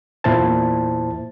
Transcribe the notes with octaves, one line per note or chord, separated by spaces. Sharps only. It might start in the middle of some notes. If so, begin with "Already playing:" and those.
E2 A#2 E4 C5 A5